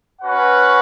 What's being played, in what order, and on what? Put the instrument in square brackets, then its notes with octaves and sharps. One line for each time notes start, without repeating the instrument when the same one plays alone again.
[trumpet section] C#4 F#4 B4 F#5